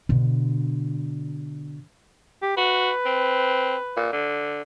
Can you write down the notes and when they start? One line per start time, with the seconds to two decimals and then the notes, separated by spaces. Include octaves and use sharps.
0.09 B2 D3
2.42 G4
2.57 F#4 B4
3.06 C4
3.97 A#2
4.13 D3